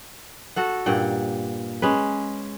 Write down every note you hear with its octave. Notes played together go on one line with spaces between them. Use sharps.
F#4 A4 F#5
G2 A#2 F#5 G5
G#3 C#4 B4